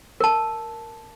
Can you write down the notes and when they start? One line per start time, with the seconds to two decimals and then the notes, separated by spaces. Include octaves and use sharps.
0.20 A#4 A5